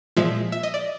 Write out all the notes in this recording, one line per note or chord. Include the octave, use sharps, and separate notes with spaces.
A#2 F3 G#3 E5
E5
D#5
D5